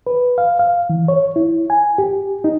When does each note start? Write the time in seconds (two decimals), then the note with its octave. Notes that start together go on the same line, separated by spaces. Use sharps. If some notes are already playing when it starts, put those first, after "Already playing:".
0.07 B4
0.38 F5
0.59 F5
0.90 E3
1.08 C#5
1.36 E4
1.70 G#5
1.98 G4
2.44 D#4